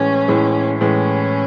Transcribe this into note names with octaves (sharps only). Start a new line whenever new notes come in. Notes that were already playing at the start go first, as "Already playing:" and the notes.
Already playing: A2 E3 G#3 C#4
A2 E3 G#3
A2 E3 G#3 C#4